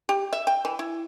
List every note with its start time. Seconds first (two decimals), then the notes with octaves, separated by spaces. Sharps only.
0.09 G4
0.33 E5
0.47 G5
0.65 E3
0.79 E4